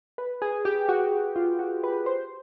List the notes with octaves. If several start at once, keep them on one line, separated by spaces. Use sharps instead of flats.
B4
G#4
G4
F#4
F4
F#4
B4
C5